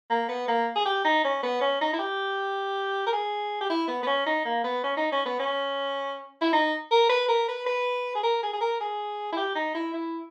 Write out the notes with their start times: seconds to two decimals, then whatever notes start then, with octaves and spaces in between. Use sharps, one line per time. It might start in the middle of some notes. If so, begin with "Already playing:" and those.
0.10 A#3
0.29 B3
0.48 A#3
0.76 G#4
0.86 G4
1.05 D#4
1.25 C#4
1.43 B3
1.61 C#4
1.81 D#4
1.93 E4
1.99 G4
3.07 A#4
3.13 G#4
3.61 G4
3.70 E4
3.88 B3
4.03 B3
4.07 C#4
4.26 D#4
4.45 A#3
4.64 B3
4.84 C#4
4.97 D#4
5.12 C#4
5.26 B3
5.40 C#4
6.42 E4
6.53 D#4
6.91 A#4
7.10 B4
7.29 A#4
7.49 B4
7.67 B4
8.15 G#4
8.24 A#4
8.43 G#4
8.53 G#4
8.61 A#4
8.81 G#4
9.33 E4
9.37 G4
9.55 D#4
9.75 E4
9.94 E4